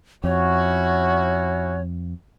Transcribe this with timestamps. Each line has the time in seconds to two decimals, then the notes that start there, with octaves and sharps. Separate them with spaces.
0.24 F2 C#4 E4 F#4 C#5